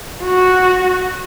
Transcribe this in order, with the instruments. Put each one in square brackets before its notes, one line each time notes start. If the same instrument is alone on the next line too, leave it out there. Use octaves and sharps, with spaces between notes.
[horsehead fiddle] F#4